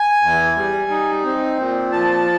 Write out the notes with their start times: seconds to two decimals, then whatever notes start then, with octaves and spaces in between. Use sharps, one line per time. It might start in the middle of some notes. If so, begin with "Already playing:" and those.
Already playing: G#5
0.22 E2
0.56 G3
0.90 D#4
1.24 C4
1.58 A#2
1.92 F3 A5